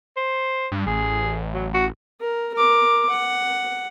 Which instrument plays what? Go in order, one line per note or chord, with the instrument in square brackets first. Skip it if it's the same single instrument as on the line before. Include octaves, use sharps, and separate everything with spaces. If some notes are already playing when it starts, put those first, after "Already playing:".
[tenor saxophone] C5
[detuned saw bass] G2
[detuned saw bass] A1 [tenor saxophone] G#4
[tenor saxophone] F#3
F#4
[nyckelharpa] A#4
A#4 D6
F#5